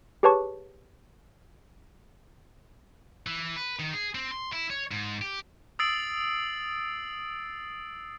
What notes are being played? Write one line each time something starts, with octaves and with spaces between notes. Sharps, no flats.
G4 G#4 B4 C#5 A5 C#6
E3
B4
D#3
G#4
C4
C6
E4
C#5
G#2
G4
D#6 E6 A6 C7 D7 F#7